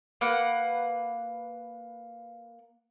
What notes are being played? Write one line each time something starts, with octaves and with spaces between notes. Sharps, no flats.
A#3 B4 F#5